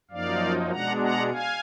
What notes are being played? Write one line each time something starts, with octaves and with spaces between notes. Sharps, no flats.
F#2 F3 A#3 D#4 D5 F5
B2 G#3 D4 F#5 A#5
F#5 A#5
F5 G#5